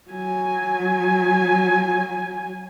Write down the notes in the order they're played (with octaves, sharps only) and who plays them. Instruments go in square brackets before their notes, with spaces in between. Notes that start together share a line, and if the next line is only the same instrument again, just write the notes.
[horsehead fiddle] F#3 G#5